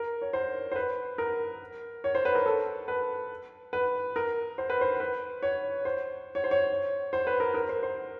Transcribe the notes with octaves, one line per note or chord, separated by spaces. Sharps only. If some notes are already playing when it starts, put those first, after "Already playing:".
Already playing: A#4
C#5
C5
C5
B4
A#4
C#5
C5
B4
A#4
A4
B4
B4
A#4
C5
B4
C5
B4
C#5
C5
C#5
C5
C#5
C5
B4
A#4
A#4
C5
C5